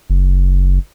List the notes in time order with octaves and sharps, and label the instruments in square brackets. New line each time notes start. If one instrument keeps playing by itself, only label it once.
[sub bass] F#1